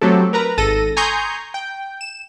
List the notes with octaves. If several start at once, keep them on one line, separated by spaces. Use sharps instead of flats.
F#3 A3 C4 G4 A4
A#4 B4 A#5
G#1 A4 A#6 D#7
G#5 A#5 C6 C#6 D#6 G6
G5
E7